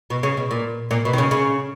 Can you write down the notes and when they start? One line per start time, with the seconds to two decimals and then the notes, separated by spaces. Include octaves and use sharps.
0.10 B2
0.23 C#3
0.37 B2
0.51 A#2
0.91 A#2
1.05 B2
1.13 D#3
1.18 C#3
1.31 C#3